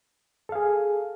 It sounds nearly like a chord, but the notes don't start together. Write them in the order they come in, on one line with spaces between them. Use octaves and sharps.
A4 F5 G#4